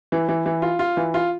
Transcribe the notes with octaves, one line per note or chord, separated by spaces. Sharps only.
E3
E3
E3
F4
F4
E3
F4